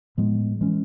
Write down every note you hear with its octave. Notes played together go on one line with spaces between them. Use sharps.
A2 F3 G#3 B3
E3 G#3 C#4